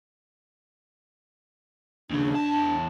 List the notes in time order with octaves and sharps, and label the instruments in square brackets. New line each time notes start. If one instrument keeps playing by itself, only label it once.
[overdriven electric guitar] D#2 C#3 [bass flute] D4
[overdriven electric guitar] E2 A5